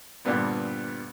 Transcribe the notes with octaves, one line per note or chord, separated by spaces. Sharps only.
G2 A#2 D3 G3 B3 C4